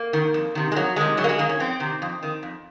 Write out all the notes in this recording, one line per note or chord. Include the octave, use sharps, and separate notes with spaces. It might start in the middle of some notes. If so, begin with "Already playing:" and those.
Already playing: A#3
D#3
F2
C3 D#3
G#3
F2 F#3
C3 D#3 G#3
F#2 F#3
A#3
G#3
D#3 A#3
C#4
F2 C4
C3 D#3
F2
D#3
F2